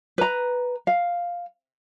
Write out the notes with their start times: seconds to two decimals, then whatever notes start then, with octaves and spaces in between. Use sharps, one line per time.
0.18 B4 A#5
0.87 F5